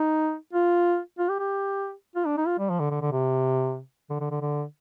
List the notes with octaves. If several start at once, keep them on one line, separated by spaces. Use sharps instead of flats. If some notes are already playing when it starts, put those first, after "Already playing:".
Already playing: D#4
F4
F4
G4
G4
F4
D4
D#4
F4
G3
F3
D3
D3
D3
C3
D3
D3
D3
D3